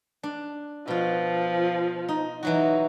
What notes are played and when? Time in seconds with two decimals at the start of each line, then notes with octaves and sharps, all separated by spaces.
0.23 D4
0.88 B2 F3 F4
2.09 D#4
2.43 E3 F#3 D#4 F#4